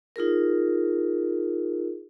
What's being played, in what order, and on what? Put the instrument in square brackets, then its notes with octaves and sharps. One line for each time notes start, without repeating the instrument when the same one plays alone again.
[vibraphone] D#4 F4 G#4 A#4